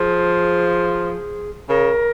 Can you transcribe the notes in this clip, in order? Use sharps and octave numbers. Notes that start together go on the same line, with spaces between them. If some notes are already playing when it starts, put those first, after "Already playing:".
Already playing: F3 G#4
C#3 A#4